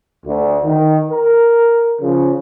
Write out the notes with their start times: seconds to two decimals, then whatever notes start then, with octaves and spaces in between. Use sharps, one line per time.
0.25 D2
0.64 D#3
1.11 A#4
2.01 C#3 F3